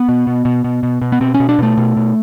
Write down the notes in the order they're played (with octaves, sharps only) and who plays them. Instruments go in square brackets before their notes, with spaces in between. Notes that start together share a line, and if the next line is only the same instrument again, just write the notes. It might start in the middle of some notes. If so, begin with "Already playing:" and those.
Already playing: [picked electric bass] B3
B2
B2
B2
B2
B2
B2
B3
B2 C4
C#4
B2
D4
B2 A3
B2
B2